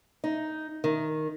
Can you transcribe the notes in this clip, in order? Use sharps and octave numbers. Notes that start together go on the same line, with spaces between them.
D#4
D#3